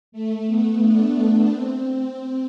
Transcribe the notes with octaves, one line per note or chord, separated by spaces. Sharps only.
A3
B3
D4
C4